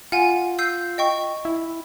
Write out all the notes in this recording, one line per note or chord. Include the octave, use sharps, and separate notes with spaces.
F4 F#5 G#5
E6 G6 C7
D#5 G5 C#6
E4